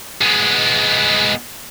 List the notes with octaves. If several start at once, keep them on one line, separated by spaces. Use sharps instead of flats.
G#3 B3